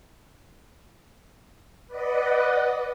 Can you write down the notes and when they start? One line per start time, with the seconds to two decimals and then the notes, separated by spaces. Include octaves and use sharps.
1.87 B4 D5 D#5 F#5